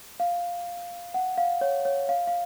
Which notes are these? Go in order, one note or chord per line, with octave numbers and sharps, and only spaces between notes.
F5
F#5
F5
C#5
C#5
F5
F5